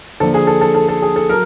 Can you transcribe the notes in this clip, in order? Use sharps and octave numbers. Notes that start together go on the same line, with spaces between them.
D3 F3 A#3 A4
G#4
A4
A4
A4
A4
G#4
A4
F#3 A#4